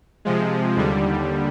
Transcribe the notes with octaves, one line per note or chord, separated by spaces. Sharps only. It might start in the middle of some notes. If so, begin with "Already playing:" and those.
C3 F3 G#3
D#2 D3 G3